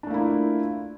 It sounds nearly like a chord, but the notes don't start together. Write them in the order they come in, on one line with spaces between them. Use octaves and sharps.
D4 A3 A#3 E4 F4